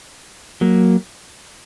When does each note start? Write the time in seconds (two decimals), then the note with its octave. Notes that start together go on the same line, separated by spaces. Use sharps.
0.61 F#3 A#3